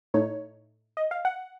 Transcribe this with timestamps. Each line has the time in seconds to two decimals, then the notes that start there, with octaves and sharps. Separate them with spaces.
0.14 A2 A3 D#4 C#5
0.97 D#5
1.11 F5
1.25 F#5